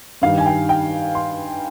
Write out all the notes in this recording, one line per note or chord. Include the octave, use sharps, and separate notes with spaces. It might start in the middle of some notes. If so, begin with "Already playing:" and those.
G2 D#3 G3 F5
G#5
G5
G5
C6